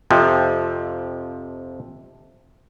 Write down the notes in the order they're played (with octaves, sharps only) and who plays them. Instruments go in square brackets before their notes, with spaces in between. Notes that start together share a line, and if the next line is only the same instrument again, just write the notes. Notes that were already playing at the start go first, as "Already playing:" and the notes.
[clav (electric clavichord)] F2 C3 F3